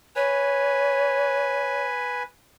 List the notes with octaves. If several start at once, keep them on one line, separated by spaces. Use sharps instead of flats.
B4 C#5 G#5